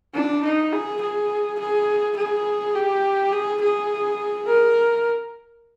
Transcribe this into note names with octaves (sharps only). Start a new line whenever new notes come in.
D4
D#4
G#4
G#4
G#4
G#4
G4
G#4
G#4
A#4